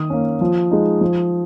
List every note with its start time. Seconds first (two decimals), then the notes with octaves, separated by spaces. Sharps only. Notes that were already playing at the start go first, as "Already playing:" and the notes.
Already playing: D#3 D#6
0.10 A#3 C#4
0.41 F3
0.71 G#3 D#4
1.01 F3